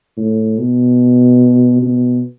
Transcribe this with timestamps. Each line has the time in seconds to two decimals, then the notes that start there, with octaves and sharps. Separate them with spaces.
0.17 A2
0.58 B2
1.82 B2